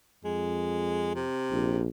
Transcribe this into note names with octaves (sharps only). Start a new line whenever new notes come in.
F2 G#3
C3
A#1